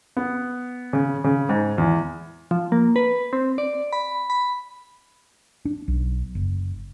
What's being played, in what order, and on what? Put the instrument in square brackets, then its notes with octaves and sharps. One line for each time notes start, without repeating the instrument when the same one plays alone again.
[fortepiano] B3
C#3
C#3
G#2
E2
[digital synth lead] F3
A#3
B4
C4
D5
B5
B5
[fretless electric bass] D4
B1
F#1